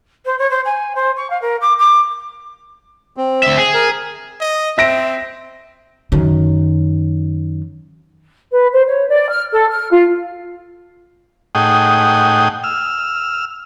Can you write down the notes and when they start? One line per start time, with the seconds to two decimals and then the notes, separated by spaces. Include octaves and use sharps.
0.25 C5
0.38 C#5
0.50 C5
0.65 G#5
0.95 C5
1.16 C#6
1.30 F5
1.41 A#4
1.61 D6
1.78 D6
3.17 C4
3.43 D2 E5
3.58 G#4
3.74 A#4
4.41 D#5
4.78 C4 E5 A#6 D7
6.12 F#2 D#3
8.52 B4
8.73 C5
8.88 C#5
9.09 D5
9.29 F6
9.52 A4
9.70 F6
9.92 F4
11.55 A2 D#4 G#4 F#5 G5 D#6
12.64 E6 F6